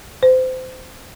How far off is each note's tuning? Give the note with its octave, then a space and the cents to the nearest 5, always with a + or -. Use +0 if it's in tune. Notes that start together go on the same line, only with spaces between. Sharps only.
C5 -25